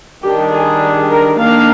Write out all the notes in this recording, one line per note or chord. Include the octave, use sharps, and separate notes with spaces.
D#3 G3 D4 G4
G#4
A#4
D#3 A#3 D4 F5